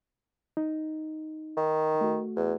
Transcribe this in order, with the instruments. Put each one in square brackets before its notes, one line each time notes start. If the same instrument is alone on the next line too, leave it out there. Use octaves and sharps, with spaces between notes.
[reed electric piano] D#4
[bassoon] D#3
[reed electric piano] A3 F#4
[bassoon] E2